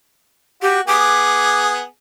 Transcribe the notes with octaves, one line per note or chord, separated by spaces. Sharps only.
F#4 G4
B3 G#4 D6